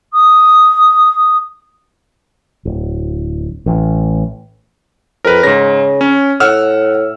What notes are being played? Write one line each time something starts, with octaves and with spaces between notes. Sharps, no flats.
D#6
D1
A1
F2 A#4 B4
G#2 C#3 A#6
C#4
A2 F#5 E6 F6